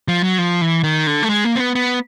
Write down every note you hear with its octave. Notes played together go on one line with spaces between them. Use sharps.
F3
F#3
F3
E3
D#3
D3
A3
G#3
A#3
C4
B3
B3